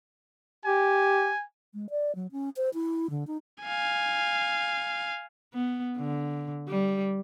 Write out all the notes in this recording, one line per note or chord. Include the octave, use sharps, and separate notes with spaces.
G4 G#5
G#3
D5
F#3
C#4
C5
E4
D3
D#4
F5 G#5
B3
D3
G3